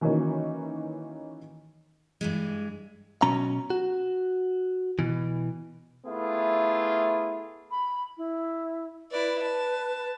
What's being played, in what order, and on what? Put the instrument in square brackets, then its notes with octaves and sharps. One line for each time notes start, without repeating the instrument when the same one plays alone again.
[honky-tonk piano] D#3 E3 F#3 A#3 C#4 D#4
[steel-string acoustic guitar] G2 E3 G#3
[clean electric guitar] B2 F#3 C#4 A#5
F#4
B2 E3
[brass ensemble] A3 B3 E4 F4 G#4
[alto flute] B5
E4
[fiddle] E4 D5 [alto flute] B4
[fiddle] A5